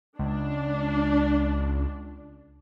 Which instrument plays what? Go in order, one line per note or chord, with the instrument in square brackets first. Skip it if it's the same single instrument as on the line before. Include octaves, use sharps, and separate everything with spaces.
[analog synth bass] C#2 [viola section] D4